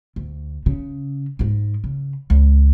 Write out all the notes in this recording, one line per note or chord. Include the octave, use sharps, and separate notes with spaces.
D2
C#3
G#2 G#3
C#3
C#2